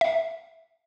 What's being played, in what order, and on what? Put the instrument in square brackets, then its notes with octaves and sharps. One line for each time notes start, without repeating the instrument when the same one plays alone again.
[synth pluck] E5